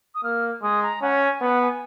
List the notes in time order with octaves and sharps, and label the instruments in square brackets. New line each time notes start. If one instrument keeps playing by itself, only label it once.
[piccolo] D#6
[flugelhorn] A#3 [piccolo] F6
[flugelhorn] G#3 [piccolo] D#6
[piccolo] A#5
[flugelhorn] C#4 [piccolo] F#5
[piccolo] G#5
[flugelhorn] B3 [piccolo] F#5
[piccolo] G#5